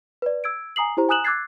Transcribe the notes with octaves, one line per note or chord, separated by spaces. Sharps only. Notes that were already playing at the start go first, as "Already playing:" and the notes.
B4 D5
E6 G#6 D7
G#5 A#5 D#6 C7 F#7
E4 G4 C5 A#5
G#5 A#5 D#6 F#6 E7 F#7
D6 E6 F#6 G#6 A6 C7